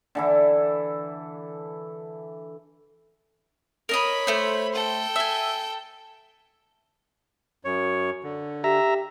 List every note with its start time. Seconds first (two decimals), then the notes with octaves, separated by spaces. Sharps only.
0.15 D3 E3 E4
3.89 A#4 C#5 D#5 B5 D#6
4.27 A3 C5
4.72 A4 G5
5.16 E5 G#5
7.65 F#2 C#5
8.23 D3
8.64 G4 E5 A#5